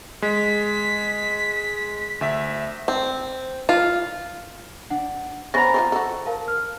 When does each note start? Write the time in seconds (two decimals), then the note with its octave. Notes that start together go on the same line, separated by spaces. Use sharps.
0.22 G#3 B6
2.21 D2 E5 B6
2.88 C4
3.69 F4
4.90 D4 F#5
5.54 B3 C#4 C5 G#5 A#5 B5 A6 A#6
5.74 C4 D#4 F4
5.92 F#4 A4
6.26 A#4 F5 A5
6.48 F6